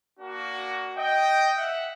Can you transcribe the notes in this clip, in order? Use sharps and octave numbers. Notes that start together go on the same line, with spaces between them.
A#3 D4 F#4
D#5 G5
E5 F#5